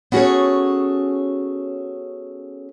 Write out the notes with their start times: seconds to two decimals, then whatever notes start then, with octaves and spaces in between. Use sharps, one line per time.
0.12 B3 C#4 F#4 G#4 A4 C#5